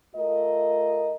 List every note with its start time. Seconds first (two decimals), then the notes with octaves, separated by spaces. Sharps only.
0.15 A3 F4 A#4 D#5